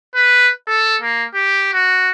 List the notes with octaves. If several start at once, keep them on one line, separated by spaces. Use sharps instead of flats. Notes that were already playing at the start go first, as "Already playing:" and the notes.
B4
A4
A#3
G4
F#4